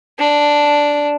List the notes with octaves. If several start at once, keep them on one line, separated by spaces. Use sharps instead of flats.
D4